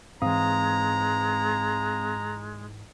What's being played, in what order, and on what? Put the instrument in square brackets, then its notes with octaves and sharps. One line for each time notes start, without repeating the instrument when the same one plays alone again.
[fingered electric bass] G#2 E3 [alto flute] G#3 [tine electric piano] C4 F5 D#6 [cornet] A#5